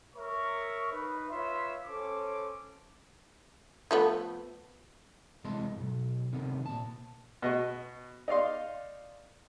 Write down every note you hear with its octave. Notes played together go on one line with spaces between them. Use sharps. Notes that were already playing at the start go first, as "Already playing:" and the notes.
A#4 C#5 E5 C#6
D#4 B4
F4 B4 C#5 E5 B5 C6
C#4 A4 C5 D6
F3 A3 B3
C3 E3 G#3 D#5 A5 C6
B1 G#2
C3 D#3 B3
A#2 A5
B2 D#5 C#6
D#4 D5 F5 C6